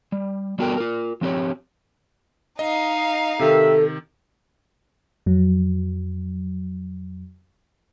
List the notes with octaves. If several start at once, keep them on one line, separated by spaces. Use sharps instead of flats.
G3
G3 B3 F#4 A4 A#4 G5
F4 A#4
F3 C4 G4 C#5
D#4 D#5 F5
C3 D#3 G4 A4 A#4 E5
F2 F#3